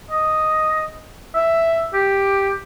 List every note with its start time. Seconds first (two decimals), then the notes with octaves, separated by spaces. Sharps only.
0.10 D#5
1.35 E5
1.93 G4